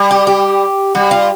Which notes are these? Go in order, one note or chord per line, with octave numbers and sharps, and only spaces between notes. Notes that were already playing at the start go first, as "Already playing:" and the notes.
Already playing: G3
G4
G4
G3 F#4
F4